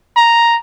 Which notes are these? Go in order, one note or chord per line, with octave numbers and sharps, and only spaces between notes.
A#5